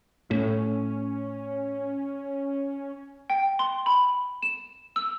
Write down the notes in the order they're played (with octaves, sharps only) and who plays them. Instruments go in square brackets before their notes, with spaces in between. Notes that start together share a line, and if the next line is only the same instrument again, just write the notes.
[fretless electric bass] A2 [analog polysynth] C#4
[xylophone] G5
C6
B5
E7
E6